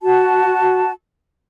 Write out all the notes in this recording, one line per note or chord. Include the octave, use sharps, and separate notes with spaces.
F#4 A5